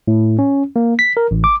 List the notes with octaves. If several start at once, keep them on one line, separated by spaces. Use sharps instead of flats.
A2
C#4
A#3
B6
A#4
A1
D6